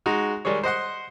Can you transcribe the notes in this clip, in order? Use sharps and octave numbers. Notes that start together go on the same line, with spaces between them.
G#3 D#4 F#4
D#3 G3 G#3 G#4 C#5
C5 D#5 F#5 C6